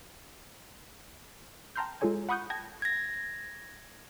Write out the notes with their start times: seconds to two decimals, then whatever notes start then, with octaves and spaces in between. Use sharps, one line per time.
1.76 G5 A5 A#5 C6 F6 G6
2.01 G#3 F4 G#4 A4 C#5 G#5
2.29 F#5 B5 C#6 D#6 F#6 G6
2.50 G5 A5 G#6 A#6
2.82 G#6 A#6